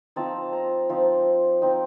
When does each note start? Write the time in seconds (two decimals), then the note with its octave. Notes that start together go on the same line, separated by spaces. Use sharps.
0.16 F3 C4 D#4 A5
0.53 A#5
0.89 F3 C4 D#4 A5
1.62 F3 C4 D#4 G5